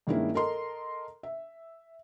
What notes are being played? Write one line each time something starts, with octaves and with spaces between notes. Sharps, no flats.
G2 D#3 G#3 A#3 C#4 E4
A4 A#4 D#5 A#5 C6
E5